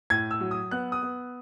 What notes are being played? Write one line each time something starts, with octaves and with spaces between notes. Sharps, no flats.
A2 G#6
E6
F#3
D#6
B3 F#6
D#6
B3